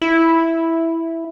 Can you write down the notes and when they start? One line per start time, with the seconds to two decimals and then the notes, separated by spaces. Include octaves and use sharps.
0.02 E4